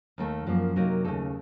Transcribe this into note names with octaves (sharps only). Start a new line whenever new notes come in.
D#2 D#3 A3
F#2 F3 A#3
C3 F#3 A#3 D#4 A#4
D#2 C#3 A3 D#4 A4